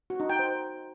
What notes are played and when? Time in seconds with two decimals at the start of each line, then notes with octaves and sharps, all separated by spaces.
0.10 F#4
0.20 D#4
0.30 G5
0.39 C5